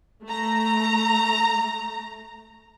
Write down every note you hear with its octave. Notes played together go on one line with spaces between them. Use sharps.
A3 A#5